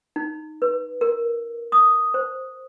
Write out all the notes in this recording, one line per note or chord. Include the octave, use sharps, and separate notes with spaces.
D#4
B4
A#4
D#6
C5